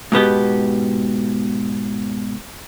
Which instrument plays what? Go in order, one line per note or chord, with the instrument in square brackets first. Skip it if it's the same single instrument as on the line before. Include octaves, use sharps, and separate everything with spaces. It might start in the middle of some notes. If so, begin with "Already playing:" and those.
[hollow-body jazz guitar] G#2 B2 B3 G4